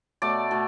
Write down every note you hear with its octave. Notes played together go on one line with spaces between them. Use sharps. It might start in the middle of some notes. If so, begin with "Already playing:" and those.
B2 A3 D5
B2 A3